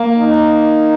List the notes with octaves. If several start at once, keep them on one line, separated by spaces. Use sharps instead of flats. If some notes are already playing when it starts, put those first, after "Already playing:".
Already playing: A#3
D#4